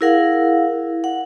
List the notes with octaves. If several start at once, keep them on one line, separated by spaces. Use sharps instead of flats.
E4 G#4 A#4 F5 F#5
F#5